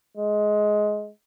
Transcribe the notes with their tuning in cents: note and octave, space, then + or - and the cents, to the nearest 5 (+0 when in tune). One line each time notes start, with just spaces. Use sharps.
G#3 +15